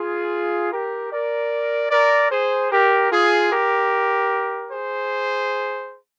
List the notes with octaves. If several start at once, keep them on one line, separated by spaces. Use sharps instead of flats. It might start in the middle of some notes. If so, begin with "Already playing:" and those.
Already playing: F4 G#4
G4 A#4
A#4 D5
A#4 D5
G#4 C5
G4 A#4
F4 G#4
G4 A#4
G#4 C5